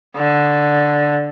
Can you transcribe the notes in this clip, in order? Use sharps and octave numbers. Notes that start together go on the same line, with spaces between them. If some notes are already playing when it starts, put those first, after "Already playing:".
D3